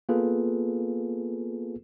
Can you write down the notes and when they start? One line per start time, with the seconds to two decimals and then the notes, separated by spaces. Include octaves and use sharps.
0.09 A#3 B3 F4 G#4 A4 B4